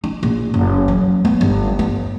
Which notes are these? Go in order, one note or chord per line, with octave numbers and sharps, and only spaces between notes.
D#4
A#1
F#1
F#3
B3
G1
B3